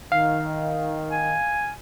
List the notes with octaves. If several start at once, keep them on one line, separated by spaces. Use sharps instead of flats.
D#3 F5
G#5